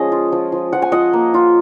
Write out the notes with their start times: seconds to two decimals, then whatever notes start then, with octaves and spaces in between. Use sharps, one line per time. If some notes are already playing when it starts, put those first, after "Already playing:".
Already playing: F3 G#3 C#4 G#4 D#5
0.12 F4
0.32 F3
0.52 F3
0.73 F3 F#5
0.82 G#5
0.92 F3 D#5 F#5
1.13 A#3
1.34 F4